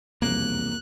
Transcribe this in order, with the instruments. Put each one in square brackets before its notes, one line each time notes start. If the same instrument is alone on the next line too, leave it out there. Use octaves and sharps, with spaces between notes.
[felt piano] E1 C2 F2 [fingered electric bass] A#3 [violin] F#6